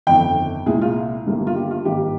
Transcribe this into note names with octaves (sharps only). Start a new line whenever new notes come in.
G1 F2 D#3 G5
C2 A#2 G#3 G#4
F4
G1 G2 D#3 G3 A#3
F4
G4
F4
G#1 G2 D#3 G3 A#3 G4